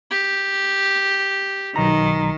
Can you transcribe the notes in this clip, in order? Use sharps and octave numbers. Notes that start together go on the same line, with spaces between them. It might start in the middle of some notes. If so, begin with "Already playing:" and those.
G4
B1 D#3 A#5